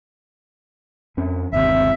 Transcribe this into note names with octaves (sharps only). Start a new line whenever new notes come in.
F2 C#4
G1 D#2 C3 E5